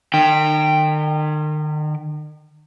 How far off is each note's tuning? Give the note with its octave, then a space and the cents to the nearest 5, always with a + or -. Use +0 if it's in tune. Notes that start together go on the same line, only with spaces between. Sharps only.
D#3 -40 G5 +0